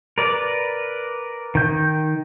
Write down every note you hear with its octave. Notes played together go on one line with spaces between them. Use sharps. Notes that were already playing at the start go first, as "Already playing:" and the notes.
A#4 B4 D5
D#3 G6